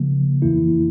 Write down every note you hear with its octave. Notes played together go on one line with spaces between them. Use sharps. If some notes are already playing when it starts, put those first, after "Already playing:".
Already playing: C#3 F3 A#3
F2 E3 A#3 E4